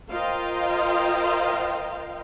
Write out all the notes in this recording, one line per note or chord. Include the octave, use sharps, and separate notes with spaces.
F4 A#4 C5 D#5 F5 G5